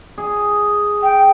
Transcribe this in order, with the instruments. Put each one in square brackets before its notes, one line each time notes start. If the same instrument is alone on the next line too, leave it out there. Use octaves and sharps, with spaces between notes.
[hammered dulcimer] G#4
[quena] G5